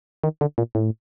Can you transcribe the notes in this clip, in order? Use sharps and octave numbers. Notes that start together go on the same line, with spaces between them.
D#3
D3
A#2
A2